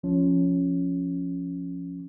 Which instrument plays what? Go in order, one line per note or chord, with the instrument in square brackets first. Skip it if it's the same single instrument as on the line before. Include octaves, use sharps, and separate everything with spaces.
[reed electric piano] C2 F3 C#4